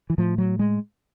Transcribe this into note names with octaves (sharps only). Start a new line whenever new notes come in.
E3
A2 F3
F#3
G#3